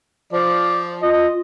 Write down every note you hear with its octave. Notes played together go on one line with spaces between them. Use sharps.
F3 D5
F4 D#5